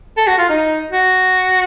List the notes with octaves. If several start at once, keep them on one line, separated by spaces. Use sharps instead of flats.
A4
F#4
F4
D#4
F#4